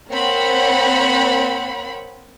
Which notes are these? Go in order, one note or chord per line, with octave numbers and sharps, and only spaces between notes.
A#3 C4 C#5 F#5 B5